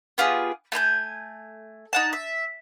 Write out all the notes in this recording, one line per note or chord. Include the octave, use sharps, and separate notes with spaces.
B3 F4 G4 G#4
A3 G#5 A#5 G6
D#4 F#5 A5
E5